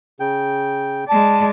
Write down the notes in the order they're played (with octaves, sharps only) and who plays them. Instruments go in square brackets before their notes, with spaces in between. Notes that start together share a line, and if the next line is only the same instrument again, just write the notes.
[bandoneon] C#3 G5
[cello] G#3 D5 [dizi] A5